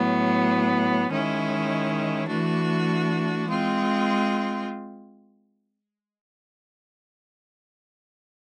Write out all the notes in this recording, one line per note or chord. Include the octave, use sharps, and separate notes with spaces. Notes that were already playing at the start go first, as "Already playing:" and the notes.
Already playing: A2 F#3 B3
D#3 G#3 C#4 E4
E3 A3 D4 F#4
G#3 C4 F4